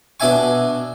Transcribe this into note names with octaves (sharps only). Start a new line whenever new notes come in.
B2 D4 D5 E5 G#5 C#6